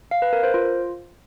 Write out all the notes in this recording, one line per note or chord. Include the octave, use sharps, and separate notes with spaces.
F5
B4
A#4
C5
F4